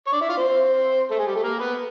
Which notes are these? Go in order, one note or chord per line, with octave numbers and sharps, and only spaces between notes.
C#5
D4 D5
E4 E5
F4 F5
C4 C5
A3 A4
G#3 G#4
G3 G4
A3 A4
A#3 A#4
B3 B4